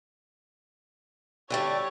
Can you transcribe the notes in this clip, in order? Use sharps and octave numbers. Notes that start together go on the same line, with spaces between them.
D3 G3 A3 C#5